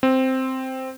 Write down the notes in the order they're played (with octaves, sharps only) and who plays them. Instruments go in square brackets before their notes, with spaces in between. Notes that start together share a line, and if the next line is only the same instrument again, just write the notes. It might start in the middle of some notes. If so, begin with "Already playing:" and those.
[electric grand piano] C4